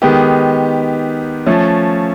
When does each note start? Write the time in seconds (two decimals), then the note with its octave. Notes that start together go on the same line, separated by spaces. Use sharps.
0.02 D#3 G#3 B3 D#4 G4
1.46 F3 A3 C#4